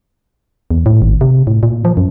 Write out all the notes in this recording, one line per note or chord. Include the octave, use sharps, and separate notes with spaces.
E2
A2
G#1
C3
A2
A#2
F3
F#2